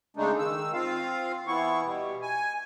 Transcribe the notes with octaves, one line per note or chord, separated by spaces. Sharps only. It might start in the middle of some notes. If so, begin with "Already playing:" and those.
C#3 G#3 A3 D4 D#4
D#3 E6
C4 F4 F5
E3 B3 E4 C#6
B2 G3
G#5